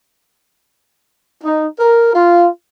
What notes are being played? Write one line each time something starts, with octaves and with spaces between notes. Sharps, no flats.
D#4
A#4
F4